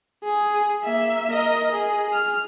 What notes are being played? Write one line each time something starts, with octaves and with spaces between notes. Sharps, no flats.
G#4
A#3 E5
A#4 D#5
G#4
F6